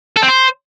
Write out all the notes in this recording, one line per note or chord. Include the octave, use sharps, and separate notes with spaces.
A4
C4
C5